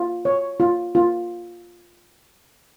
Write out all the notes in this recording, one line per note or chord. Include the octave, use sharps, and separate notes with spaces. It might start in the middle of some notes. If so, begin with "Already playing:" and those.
Already playing: F4
C#5
F4
F4